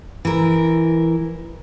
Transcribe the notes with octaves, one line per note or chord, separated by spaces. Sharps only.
E3 A#4